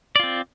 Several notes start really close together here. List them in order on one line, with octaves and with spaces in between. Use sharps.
D5 F4 C4